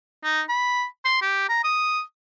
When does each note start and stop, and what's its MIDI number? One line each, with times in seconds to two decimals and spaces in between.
0.24 0.42 63
0.49 0.84 83
1.05 1.19 84
1.22 1.49 67
1.49 1.60 82
1.64 2.01 87